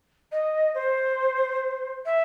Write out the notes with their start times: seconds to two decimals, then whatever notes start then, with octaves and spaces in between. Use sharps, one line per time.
0.31 D#5
0.74 C5
2.05 E5